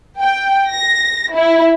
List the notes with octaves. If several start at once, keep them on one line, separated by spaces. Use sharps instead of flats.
G5
A#6
E4